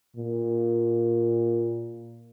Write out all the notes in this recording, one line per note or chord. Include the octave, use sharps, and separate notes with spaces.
A#2